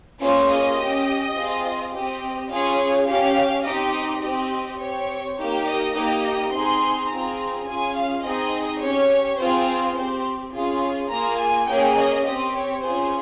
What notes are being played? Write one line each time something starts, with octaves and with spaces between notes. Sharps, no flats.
A#3 C#4 F4 G#4 C5
D#5
C#4 G4
C4 F4 G#4
C4 G4 D#5
C#4 F4 G#4 C#5
C#4 G4 F5
C4 D#4 G4 D#5
C4 G4 D#5
C4 G4 C#5
A#3 D#4 G4
D#5
A#3 D#4 G4
C4 D#4 G#4 C6
C4 F4 G#4 A#5
C#4 F4 G#4 G#5
F5
C4 D#4 G#4 D#5
C#4 G4 C#5
C4 F4 G#4 C5
C4 G4 C5
C#4 F4 G#4
A#3 F4 G#4 A#5
G#5
A#3 C#4 G#4 G5
D#5
C4 G4 D#5
C#5
C#4 F4 G#4 C5